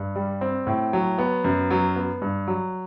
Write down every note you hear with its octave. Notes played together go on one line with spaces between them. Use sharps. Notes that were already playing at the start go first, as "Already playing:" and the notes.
Already playing: G2
G3
C4
A2
F#3
B3
F#2
F#3
B3
G2
F#3